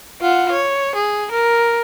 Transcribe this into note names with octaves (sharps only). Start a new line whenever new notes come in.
F4 F#5
C#5
G#4
A#4